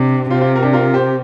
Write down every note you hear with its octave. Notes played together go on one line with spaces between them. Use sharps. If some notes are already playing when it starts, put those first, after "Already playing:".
Already playing: C3 D4 G4
C3 C4 F4
C4 F4
A#4
D4 G4
F4 A#4
G4 C5